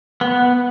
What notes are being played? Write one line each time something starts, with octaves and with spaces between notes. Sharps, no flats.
B3